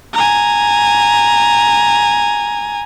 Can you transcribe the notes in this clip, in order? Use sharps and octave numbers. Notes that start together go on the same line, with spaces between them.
G#5 A#5